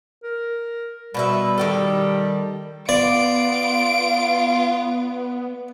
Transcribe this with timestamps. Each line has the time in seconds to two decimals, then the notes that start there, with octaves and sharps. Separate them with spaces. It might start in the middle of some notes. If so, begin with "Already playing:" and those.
0.24 A#4
1.14 B2 G3 B4 E5
1.58 D#3 G4 A4
2.89 B3 F4 D5 D7